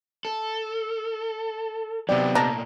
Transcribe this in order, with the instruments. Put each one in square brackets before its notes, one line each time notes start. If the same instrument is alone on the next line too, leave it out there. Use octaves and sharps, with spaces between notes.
[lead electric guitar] A4
[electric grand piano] C3 B3 G5 [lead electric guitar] D#3 F#3 [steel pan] D5
[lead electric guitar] A#2 A3 [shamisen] D4 [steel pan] A#5